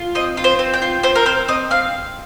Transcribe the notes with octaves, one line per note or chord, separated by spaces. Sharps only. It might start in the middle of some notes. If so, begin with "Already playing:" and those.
Already playing: F4
C4 D#5
F4
C5
C4
G5
F4
C4 C5
A#4
C4 C5
C4 D#5
C4 F5